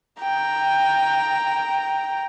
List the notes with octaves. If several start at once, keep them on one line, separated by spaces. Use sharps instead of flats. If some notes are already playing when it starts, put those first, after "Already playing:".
G5 A#5